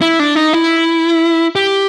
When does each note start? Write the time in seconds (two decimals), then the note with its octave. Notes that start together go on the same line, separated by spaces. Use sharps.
0.01 E4
0.19 D4
0.35 D#4
0.53 E4
1.56 G4